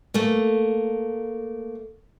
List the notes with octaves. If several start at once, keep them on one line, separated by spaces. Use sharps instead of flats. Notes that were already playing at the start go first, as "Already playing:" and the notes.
A3 A#3